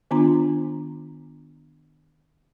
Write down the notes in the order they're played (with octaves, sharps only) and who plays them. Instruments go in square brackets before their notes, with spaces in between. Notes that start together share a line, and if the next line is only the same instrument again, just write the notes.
[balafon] D#3 B3 D4 F4 A#5